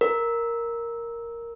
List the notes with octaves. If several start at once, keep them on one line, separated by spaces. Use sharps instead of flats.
A#4